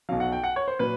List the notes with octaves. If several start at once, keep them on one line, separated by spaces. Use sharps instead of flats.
B1 B2 F#3 F5
F#5
G5
F#5
C#5
C5
A#2 F#3 B4